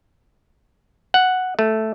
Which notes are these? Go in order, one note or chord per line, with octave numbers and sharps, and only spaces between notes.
F#5
A3